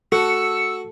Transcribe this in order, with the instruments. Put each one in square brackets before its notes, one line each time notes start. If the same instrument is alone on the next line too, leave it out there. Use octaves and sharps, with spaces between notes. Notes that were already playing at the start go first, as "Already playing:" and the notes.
[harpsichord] F#4 [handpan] A4 [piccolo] E6 [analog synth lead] C#7